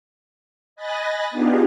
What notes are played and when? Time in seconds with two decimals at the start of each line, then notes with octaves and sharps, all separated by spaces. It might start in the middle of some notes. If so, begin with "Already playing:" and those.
0.76 D#5 G#5 B5 F#6 A6 A#6
1.31 B3 D4 D#4 F4 G4 G#4